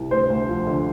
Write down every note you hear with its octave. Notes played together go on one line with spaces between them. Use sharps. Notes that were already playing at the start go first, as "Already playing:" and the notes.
Already playing: C2
D2 C5
D2
F3
D3